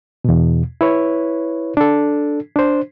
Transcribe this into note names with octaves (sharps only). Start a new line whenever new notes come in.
E2 B2
E4 B4 C#5
D4 A4
D4 C5